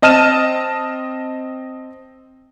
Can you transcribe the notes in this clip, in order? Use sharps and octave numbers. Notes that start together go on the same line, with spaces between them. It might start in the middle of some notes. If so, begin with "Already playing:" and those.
C4 D#5 A5 F6 D#7 E7